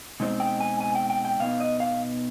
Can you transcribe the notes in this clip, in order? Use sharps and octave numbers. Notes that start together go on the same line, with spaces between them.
B2 G#3 C4 D#4
G5
G#5
G#5
G5
G5
G5
B2 B3 D#4 F5
D#5
F5